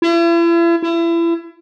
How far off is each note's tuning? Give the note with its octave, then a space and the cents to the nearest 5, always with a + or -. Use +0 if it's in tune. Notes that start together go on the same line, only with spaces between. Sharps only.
E4 +40
E4 +30